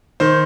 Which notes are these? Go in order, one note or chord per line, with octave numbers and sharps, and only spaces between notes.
D#3 C5